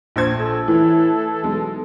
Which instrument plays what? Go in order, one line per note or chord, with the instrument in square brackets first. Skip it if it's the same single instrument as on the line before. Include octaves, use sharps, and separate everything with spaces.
[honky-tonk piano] A#1 C5 G#6
[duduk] A4
[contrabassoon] A2 [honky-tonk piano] E3
[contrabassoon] B1 [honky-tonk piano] G#3